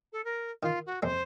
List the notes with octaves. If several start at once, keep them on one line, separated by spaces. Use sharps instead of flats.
A4
A#4
D#3 F4
F#4
F2 C3 G#3 C5